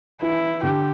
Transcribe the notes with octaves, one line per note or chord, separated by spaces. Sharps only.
E3 E4
D3 G4